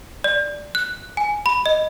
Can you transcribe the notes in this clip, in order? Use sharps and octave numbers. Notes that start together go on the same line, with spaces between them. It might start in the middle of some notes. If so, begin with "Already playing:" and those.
D5
F#6
G#5
B5
D#5